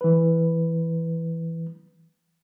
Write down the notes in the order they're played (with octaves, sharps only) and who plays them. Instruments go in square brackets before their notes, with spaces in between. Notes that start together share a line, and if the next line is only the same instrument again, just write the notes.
[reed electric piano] E3 B4